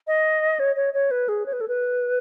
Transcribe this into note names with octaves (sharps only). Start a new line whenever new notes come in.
D#5
C#5
C#5
C#5
B4
G#4
C#5
B4
A4
B4